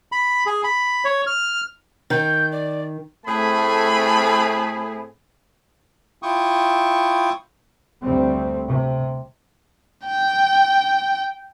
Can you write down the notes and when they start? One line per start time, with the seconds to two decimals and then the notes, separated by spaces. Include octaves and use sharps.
0.12 B5
0.46 G#4
0.64 B5
1.05 C#5
1.27 F6
2.10 D#3 G6
2.51 D5
3.26 A2 A3 C4 G#4 G#5 B5
6.23 E4 F4 G5 C#6 D#6
8.04 D2 G3 C4
8.70 C3
10.06 G5